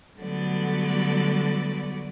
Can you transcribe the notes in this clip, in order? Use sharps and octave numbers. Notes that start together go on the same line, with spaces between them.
D3 F#3 G3 A3 B3 D5